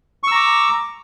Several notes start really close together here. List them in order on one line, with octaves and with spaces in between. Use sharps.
C#6 E6 A#5 D6